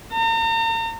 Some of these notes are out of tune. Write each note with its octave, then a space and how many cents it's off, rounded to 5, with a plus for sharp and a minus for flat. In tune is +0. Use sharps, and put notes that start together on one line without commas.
A#5 -40